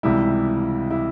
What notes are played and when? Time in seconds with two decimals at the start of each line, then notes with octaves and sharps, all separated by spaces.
0.03 C#2 C3 E3 G3 E4
0.91 E4